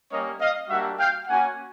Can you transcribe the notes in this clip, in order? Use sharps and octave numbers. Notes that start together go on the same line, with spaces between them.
G3 A#3 C#4 C#5 D#5
D#5 F5
G3 A#3 D4 F#4 E5 F#5
F5 G5
A#3 C#4 F#4 F#5 G#5